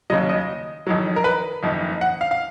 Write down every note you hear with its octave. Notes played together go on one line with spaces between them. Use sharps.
D#2 C#3 F#3 D#5
D#5
F2 D#3 F#3
A#4
B4
F#1 F2 D#3
F#5
F5
F5